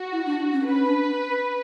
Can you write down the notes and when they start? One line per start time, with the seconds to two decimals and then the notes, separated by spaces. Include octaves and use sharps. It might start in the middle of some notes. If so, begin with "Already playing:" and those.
Already playing: F#4
0.12 E4
0.26 D4
0.53 C#4
0.61 D4
0.66 C#4 B4
0.84 D4